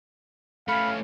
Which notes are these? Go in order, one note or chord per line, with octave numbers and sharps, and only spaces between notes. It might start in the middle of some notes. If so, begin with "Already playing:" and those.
A3 C#4 F5 B5